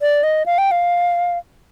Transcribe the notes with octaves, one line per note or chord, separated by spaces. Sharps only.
D5
D#5
F5
G5
F5